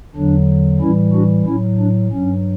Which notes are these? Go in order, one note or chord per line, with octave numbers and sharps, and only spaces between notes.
E2 D3 F#3 D4
A2 E3 G3 C#4 E4
D4 F#4
A2 F#3 C#4 E4
D4
G2 F#3 C#4